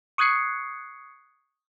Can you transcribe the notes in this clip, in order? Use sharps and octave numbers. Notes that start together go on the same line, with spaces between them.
C#6 D#6 F#6 G#6 C7 C#7